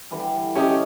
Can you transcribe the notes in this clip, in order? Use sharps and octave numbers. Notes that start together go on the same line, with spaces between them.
D3 E3 G3
C#4 G4 D#5 E5 A5